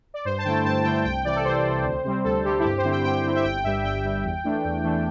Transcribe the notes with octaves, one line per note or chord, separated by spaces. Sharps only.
D5
G2 C5
A5
D3 A3 E4 G5
G2 A5
D3 A3 E4 G5
G5
C2 G5
C3 E3 D5
A4
C2 C5
C3 E3
D2
C3 G3 C4
D2 A4
C3 G3 C4 G4
E4
G2 G4
C5
D3 C4 E4
G5
G2 G5
D3 C4 E4
E5
G1 G5
G2 G3 E5
G1 G5
G2 G3
E2
E3 A3 D4
E2
E3 A3 D4